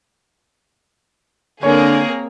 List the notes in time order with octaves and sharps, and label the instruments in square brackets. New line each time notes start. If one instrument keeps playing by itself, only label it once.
[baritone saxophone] D3 [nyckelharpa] A#3 C4 [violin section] G#4 A#4 [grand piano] C#5